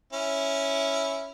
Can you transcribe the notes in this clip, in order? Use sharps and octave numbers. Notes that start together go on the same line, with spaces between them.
C#4 E4